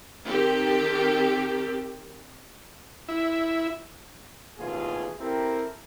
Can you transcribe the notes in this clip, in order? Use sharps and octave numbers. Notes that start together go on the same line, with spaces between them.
D#3 C4 G4 A4 A#4
E4
A1 D#2 B2 A3 F4 G#4
C4 E4 G4 A4 A#4